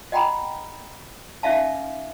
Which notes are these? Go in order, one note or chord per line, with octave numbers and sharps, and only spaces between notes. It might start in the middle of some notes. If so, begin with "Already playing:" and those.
D#5 F#5 G5 A#5 B5
C#4 D#4 E5 F5 A5